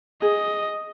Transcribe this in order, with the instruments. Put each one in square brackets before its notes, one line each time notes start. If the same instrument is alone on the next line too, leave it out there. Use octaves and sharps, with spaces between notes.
[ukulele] G#4 [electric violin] D#5